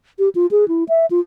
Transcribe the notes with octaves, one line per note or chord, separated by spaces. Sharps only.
G4
F4
G#4
E4
E5
F4